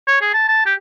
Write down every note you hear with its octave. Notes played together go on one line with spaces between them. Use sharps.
C#5
G#4
A5
A5
G4